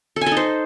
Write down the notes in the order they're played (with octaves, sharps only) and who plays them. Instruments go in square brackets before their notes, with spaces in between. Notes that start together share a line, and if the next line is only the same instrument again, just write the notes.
[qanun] A4
G#5
A4
D#4
C5